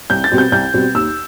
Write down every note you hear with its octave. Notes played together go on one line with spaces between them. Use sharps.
C2 G6
A6
B2 G3 C4
G6
C2 G6
B2 G3 C4
D#2 E6